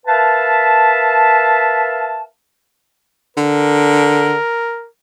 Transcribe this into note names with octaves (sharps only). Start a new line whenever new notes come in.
A#4 B4 E5 F5 A5
D3 A#4